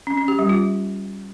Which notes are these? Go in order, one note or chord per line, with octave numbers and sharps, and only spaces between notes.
C#4
C#4
G4
G3
F4